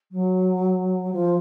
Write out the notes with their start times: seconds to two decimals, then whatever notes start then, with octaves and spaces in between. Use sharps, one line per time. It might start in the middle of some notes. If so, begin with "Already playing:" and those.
0.12 F#3
1.13 F3